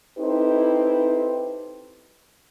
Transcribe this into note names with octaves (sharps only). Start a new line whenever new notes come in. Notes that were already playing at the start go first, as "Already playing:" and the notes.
C4 D#4 E4 G4 A4 B4